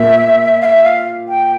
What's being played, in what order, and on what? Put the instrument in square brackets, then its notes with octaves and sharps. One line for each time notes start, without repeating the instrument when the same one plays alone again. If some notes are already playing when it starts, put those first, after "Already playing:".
Already playing: [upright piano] A#2 A#3 [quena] E5
[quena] F5
E5
F5
G5